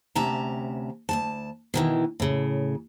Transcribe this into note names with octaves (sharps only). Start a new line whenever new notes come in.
D2 C3 C#4 A5 A#5
D2 G#2 A5
B2 D#3 E3
A2 C#3